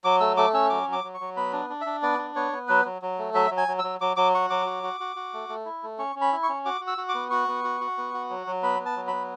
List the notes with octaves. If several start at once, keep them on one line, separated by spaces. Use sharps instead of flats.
F#3 D6
A3 E6
A3 D6
C#4 E6
F#3 D6
F#3 D6
F#3
C#6
F#3
B3 B5
D4
D4
D4 E5
B3 D5
D4
B3 C#5
B3
F#3 B4
F#3
F#3
A3
F#3 E5
F#3
G#5
F#3
F#3 E6
F#3 D6
F#3 D6
F#4 C#6
F#3 D6
F#4
F#4
F#4
F#4
A3
A3
E4
A3
C#4 C#6
C#4
B5
E4
C#6
C#4
F#4 D6
F#4
E6
F#4
D6
B3
F#4 C#6
B3
F#4
F#4
B3
F#4
F#3
F#3
B3 B5
B3
A5
F#3
B3 B5